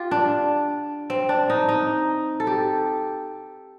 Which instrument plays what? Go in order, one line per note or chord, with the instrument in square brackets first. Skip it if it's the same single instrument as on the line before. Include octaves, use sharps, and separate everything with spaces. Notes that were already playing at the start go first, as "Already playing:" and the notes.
Already playing: [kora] F4 G4
D4
C4
D4
D#4
D#4
A4
G4